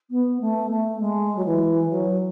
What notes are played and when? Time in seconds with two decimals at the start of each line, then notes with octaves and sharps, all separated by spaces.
0.10 B3
0.40 A3
0.70 A3
1.00 G#3
1.36 F#3
1.45 E3
1.90 F#3